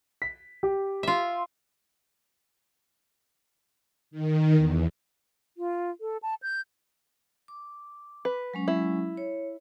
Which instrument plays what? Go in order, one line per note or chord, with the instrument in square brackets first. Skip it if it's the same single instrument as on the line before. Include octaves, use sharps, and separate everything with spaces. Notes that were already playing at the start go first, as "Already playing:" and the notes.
[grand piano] B6
G4
[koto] F4 E5
[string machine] D#3
E2
[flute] F4
A4
A5
G6
[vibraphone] D6
[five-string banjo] B4
[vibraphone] F#3 G#3 C#4
[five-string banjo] E4
[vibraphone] C#5